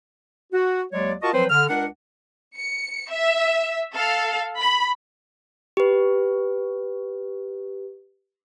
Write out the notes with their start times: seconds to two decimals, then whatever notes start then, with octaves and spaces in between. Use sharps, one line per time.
0.53 F#4
0.93 D#2 F#3 G#3 C#5 D5
1.22 F4 F#4 A#4 D#5 A5 C#6
1.34 F3 F#3 C4 B4 C5
1.50 D3 F6
1.69 C#2 D4 A#4 F#5
2.55 C#7
3.10 E5
3.93 A4 F5
4.58 B5
5.77 G4 B4